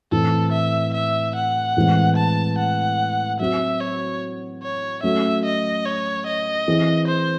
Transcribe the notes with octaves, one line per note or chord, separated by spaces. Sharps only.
A2 E3 C4 A4
E5
E5
F#5
A2 E3 G#3 C4
A5
F#5
F#3 C4 F#4 E5
C#5
C#5
F#3 A3 C#4 E5
D#5
C#5
D#5
E3 C4 E4 G#4
C5